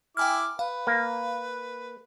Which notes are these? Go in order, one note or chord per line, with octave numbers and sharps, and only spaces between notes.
E4 G5 G#5 D6 F6
B4 F5
A#3